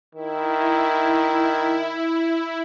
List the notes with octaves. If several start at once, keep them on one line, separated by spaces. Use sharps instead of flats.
D#3 E4